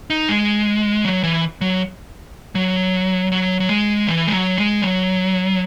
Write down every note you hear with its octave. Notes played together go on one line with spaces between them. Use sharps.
D#4
G#3
F#3
E3
F#3
F#3
F#3
F#3
G#3
E3
G#3
F#3
G#3
F#3